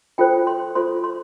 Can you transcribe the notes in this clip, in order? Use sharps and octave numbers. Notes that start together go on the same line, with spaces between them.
F4 A4 C5 G5
C6
F4 A4 C5 C6
C6